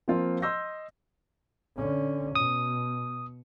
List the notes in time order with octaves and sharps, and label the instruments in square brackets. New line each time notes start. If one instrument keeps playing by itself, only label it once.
[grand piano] F3 A#3 C4 F4
D#5 C6 E6 G6 A#6
[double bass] D3 C#4
[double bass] B2 [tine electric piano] D#6